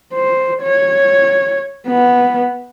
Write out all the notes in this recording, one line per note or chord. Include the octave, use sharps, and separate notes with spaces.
C5
C#5
B3